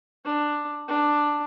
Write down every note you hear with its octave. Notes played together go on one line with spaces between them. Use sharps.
D4
D4